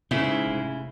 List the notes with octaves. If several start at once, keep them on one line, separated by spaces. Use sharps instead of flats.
G#2 C#3 E4
F1